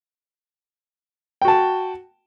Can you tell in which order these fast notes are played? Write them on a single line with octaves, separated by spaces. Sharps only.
G5 F#4 A5